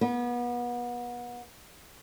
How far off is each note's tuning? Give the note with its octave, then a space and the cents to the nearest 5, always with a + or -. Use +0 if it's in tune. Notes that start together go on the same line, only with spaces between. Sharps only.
B3 -30